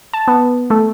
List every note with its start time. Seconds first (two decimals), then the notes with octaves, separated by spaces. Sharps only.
0.13 A5
0.28 B3
0.70 A3